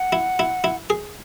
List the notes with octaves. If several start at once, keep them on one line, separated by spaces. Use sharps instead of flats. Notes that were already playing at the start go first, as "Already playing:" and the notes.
Already playing: F#5
E4
E4
E4
G#4